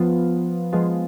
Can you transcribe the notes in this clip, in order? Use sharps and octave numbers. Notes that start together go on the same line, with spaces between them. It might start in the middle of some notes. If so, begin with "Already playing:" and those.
Already playing: F3 B3 F4
F3 G#3 B3 F4